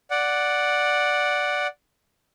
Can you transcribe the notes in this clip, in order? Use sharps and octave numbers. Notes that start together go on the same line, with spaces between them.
D5 F#5